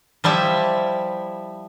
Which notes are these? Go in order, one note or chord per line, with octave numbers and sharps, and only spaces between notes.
F3 G3 E4 E5